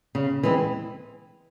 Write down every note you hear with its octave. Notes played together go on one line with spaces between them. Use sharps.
C#3
E3 G#3 C4